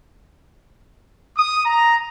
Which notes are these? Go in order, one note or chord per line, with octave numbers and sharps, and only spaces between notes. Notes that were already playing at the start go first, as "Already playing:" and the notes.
D#6
A#5